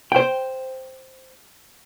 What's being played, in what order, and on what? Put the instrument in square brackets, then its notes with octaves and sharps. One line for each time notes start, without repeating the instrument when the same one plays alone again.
[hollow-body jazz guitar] C5 G5